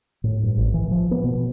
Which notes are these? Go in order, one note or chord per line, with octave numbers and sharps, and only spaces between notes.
A2
G2
A1
E3
F3
B3
B2